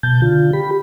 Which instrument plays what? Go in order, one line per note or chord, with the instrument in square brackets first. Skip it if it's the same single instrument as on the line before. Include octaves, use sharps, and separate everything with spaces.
[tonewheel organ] B2 A5 G6
D3 F4
G4 B5